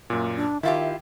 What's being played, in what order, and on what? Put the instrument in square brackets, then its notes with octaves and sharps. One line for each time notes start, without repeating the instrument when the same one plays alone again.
[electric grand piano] F#2 A#2 [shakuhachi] A#3
[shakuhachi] D4
[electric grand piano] D#3 [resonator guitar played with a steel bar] E4 F4 G4 [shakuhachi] E5